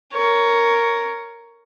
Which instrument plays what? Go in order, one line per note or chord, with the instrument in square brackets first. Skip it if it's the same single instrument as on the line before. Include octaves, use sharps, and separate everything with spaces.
[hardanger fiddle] A#4 C#5